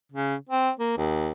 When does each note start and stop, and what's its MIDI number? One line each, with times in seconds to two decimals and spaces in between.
0.12 0.35 49
0.49 0.70 60
0.79 0.95 58
0.97 1.32 39